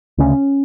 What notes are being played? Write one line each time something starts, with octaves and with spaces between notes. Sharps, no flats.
D2 C#3 C#4